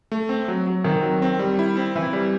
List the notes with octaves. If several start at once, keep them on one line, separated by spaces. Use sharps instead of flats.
A3
C4
F#3
F#3
D#3 C4
F#3
C4
G3
E4
C4
E3 E4
G3